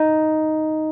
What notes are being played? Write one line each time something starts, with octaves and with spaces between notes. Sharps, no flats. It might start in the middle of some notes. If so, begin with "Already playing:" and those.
Already playing: D#4